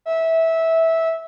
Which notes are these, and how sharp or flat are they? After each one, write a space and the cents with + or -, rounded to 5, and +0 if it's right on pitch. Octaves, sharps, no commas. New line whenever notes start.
E5 -15